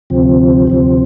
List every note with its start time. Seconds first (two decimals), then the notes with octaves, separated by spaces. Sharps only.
0.10 D2 C3 F3 C4
0.67 D2 C3 F3 C4